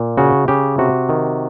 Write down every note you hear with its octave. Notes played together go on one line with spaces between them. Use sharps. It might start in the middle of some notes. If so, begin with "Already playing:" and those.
Already playing: A#2
C#3 F#4
C#3 G4
C3 F#4
D#3